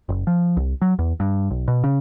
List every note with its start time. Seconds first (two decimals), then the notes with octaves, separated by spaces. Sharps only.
0.09 F#1
0.27 F3
0.57 C2
0.82 F#3
0.99 E2
1.20 G2
1.51 B1
1.68 B2
1.84 C#3